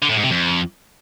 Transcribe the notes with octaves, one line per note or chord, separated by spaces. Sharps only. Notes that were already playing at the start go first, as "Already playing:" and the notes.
D3
A2
G#2
C3
F2